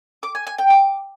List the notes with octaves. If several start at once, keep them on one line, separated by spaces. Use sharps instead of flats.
D6
G#5
G#5
G5
D6